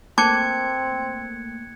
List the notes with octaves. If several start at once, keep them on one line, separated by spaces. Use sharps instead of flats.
A3 A#3 C4 A5 D6 F#6 G#6 C#7